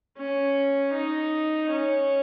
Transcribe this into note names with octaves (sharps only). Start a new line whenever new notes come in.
C#4
D#4
C#4